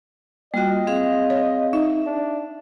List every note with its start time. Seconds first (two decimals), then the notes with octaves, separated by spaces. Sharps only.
0.54 G3 A#3 F4 F#4 D#5 G5
0.87 C4 G#4 F5
1.30 C#5
1.73 D#4 E5
2.06 D4